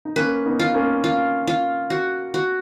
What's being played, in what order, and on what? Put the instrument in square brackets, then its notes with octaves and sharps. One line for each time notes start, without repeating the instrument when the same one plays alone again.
[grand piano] D#4
[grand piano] A#3 C#4 [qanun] B4
[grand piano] B3 D#4
[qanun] F4
[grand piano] A#3 C#4
[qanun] F4
F4
F#4
F#4